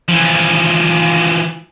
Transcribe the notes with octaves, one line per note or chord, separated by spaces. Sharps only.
E3 F3